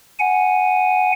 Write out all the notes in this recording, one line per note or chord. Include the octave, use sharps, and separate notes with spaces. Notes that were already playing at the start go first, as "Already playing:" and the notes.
F#5 G#5